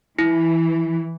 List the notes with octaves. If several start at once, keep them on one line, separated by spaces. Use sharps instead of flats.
E3 E4